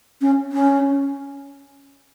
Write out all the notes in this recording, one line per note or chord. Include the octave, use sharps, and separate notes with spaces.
C#4
C#4